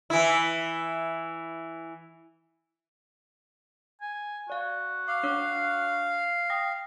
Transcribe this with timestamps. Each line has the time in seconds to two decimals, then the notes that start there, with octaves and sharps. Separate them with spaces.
0.10 E3 E4
4.02 G#5
4.50 F#4 D5 F5
5.08 F5 D6
5.23 D4 C#5 D6
6.50 G5 D#6 A#6